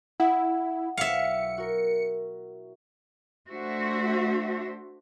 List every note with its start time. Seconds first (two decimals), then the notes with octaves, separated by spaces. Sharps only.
0.20 E4 E5 F#5 D#6
0.97 B1 E4 E5 F5 B6 C#7
1.58 F#4 A#4
3.51 A3 D4 F#4 C5 E5